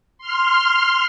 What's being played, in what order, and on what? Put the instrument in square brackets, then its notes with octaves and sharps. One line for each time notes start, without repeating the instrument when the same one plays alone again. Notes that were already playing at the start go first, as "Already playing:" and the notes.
[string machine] C6 F6